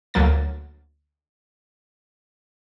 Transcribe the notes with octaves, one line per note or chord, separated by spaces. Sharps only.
D2 F#3 A#3 A6